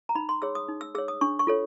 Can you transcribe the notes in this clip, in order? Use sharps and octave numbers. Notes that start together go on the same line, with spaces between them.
A#5
D#4 B5
C6
G#4 C#5 E6
D#6
D#4
E6
G#4 C#5 E6
D#6
D4 C#6
C#6
F4 A4 C#5